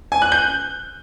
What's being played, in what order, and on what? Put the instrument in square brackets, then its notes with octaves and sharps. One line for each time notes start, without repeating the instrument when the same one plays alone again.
[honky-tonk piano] G#5
F#6
G6